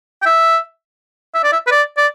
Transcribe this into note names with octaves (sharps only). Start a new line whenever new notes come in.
G5
E5
E5
D5
E5
B4
D5
D5